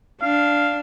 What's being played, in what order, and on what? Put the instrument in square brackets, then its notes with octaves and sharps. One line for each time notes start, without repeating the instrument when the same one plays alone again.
[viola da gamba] D4 [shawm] F5